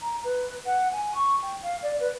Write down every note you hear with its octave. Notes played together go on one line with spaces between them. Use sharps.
A#5
B4
F#5
G#5
C#6
G5
F5
D5
B4